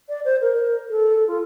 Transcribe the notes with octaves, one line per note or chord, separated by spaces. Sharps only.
D5
C5
A#4
A4
F4